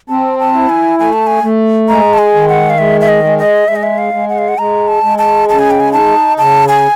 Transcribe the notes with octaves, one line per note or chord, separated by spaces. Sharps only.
C4 A5
A5
E4
G#5
A3 G#5
A5
G#5
A3
G#3 A#5
A5
G#5
D#3
F#5
F5
G#3 E5
E5
D#5
G#3
D#5
G#3 E5
D#5
E5
F5
G#3
F#5
F5
F#5
G#3 A#5
A5
G#3
A5
C#3 A5
G#5
G5
G#5
D#4 A5
C#3 A5
G#5